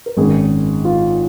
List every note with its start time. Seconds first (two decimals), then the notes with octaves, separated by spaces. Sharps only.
0.06 A#4
0.17 G#1 F#2 D#3 G#4
0.85 F4